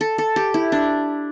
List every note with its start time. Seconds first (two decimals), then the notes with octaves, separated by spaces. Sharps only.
0.01 A4
0.18 A4
0.36 G4
0.54 E4
0.72 D4